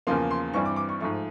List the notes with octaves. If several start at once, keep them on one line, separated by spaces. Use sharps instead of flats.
E2 C#3 F3 A#3 C6
C6
G2 E3 G3 C4 C#6
D6
D6
C#6
G#2 F3 A3 C#6